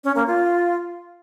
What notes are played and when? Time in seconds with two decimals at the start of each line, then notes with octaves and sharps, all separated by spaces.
0.04 C#4
0.16 A#3
0.27 F4